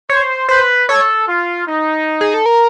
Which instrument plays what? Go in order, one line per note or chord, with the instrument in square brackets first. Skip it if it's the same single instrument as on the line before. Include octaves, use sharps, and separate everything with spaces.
[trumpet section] C5 [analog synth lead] C#5
[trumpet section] B4 [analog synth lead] C5
[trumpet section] A4 [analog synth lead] C#5
[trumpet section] F4
D#4
[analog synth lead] G#4
A4
A#4